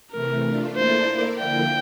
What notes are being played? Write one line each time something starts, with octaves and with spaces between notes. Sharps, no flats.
C3 E3 A3 A#4
A3 D4 F4
A#3 E4 A4 C5 D5
A#3 E4 A#4 D5
D3 F3 A#3 E4 G5